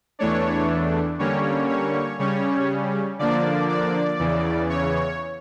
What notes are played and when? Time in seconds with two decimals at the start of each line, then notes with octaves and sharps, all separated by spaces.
0.19 E2 E3 A3 D4 C#5
1.19 D3 G3 A#3 C#4 C#5
1.69 C#5
2.19 C#3 G3 C#4 C#5
3.19 D3 F3 A#3 D4 D5
3.69 D5
4.19 E2 C#3 E3
4.69 C#5